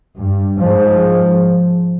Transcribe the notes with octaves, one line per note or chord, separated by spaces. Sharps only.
G2
G#2 F3